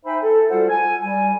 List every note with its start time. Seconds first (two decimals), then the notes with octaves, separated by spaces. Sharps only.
0.05 D#4 C5 E5 G5 G#5 B5
0.22 A4
0.50 G3 F4 F#4 A4 C5 F#5
0.69 G#5
1.02 G3 G#5